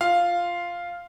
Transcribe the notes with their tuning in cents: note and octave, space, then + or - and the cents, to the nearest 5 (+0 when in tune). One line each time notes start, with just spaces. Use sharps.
F4 -5 F5 +0